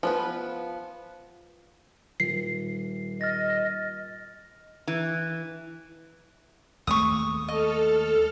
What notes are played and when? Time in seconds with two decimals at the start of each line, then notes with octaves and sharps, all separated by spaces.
0.03 F3 B3 B4
2.20 D#1 C7
3.21 D#5 F6 A6 A#6
4.87 E3
6.87 D#2 G#3 A3 C#6 D#6
7.48 A4 D#5 F6